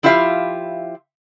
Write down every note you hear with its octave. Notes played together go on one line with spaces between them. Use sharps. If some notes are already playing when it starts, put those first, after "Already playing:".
F3 E4 F4 G4 E5 F5